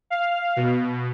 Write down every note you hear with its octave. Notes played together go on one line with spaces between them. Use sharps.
F5
B2